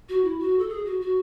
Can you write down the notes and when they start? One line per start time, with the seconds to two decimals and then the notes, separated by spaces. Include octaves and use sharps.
0.09 F#4
0.24 E4
0.39 F#4
0.59 A4
0.69 G#4
0.85 F#4
1.01 F#4